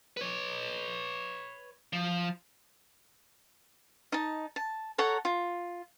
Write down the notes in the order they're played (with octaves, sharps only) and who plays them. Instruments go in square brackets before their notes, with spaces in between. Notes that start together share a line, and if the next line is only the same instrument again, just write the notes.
[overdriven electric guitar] B4 C#5
F3
[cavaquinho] D#4 A5
A5
A4 C#5 F#5 A#5
F4